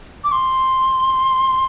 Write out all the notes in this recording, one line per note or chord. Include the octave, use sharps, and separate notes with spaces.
D6
C6